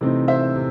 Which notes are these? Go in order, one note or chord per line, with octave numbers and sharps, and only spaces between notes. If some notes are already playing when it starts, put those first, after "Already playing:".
C3 E3 A3 C4 D#4
C5 E5
C3